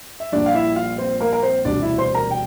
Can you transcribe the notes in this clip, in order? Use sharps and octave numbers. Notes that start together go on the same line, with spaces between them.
E5
A#1 A#2 G3 D4 D5
F5
E4 E5
F4 F5
C4 C5
A#3 A#4
A#4
C4 C5
E1 D2 C3 G3 D4 D5
E4 E5
C5 C6
A#4 A#5
G5